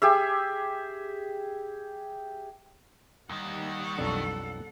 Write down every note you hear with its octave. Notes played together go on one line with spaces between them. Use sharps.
G4 G#4 E5
D#2 D#3 G3 F#5
B1 F2 D4 A4